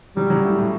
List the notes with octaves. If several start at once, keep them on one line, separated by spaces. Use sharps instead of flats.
F#3 G3
F#3
A2
A2